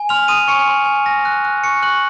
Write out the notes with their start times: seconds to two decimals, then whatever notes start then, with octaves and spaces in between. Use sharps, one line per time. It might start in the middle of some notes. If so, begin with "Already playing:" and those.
Already playing: G#5
0.09 C6 F6 F7
0.28 C6 D#6 D#7
0.48 G#5 C#6 C#7
0.67 C6
0.86 G#5
1.06 G#5 A#6
1.25 F#6
1.45 F#6
1.63 C#6 C#7
1.82 C#6 F#6 F#7